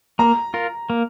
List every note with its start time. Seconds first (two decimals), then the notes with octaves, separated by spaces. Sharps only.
0.19 A#3 A#5
0.54 F4 A#4
0.90 A#3